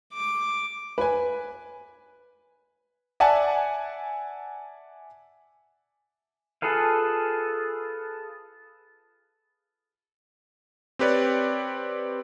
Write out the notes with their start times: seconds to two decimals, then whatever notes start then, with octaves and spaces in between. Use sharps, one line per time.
0.14 D6
0.98 B4 G#5
3.20 D5 E5 F#5 G#5 A5
6.62 F4 G#4 A4 B4 F5
10.99 C4 G4 B4 C#5 D5